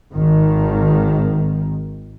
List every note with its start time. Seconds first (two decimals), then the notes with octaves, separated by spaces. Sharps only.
0.12 G#1 D#3